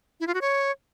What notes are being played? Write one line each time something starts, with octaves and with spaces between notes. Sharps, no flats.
E4
F4
F#4
C#5